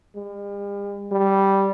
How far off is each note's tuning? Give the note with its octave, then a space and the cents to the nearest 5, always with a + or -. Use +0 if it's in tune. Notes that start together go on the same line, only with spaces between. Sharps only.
G3 +45
G3 -5